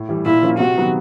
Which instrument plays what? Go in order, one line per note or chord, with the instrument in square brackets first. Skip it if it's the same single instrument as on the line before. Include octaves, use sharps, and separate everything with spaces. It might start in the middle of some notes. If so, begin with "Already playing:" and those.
Already playing: [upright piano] A2
E3 G3
[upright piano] A#2 [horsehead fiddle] E4
[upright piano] F3 A#3 C#4 F4
[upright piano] C3 [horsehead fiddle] F#4
[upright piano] D#3 F#3 B3